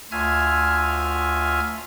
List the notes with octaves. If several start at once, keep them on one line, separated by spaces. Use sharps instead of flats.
D2 F4 E5 G#5 F6 G#6